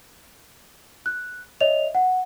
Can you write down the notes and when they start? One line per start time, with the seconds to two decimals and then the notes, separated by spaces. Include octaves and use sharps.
1.06 F#6
1.61 C#5 D#5 E5 F7
1.95 F#5